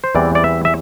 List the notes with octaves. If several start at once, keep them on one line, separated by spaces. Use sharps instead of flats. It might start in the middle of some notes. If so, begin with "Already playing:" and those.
C5
E2 E3 G3 C4 D5
D5
E5
E5